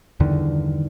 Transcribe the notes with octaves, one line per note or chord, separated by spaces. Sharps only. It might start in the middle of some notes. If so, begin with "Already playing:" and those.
E2 G2 D3 D#3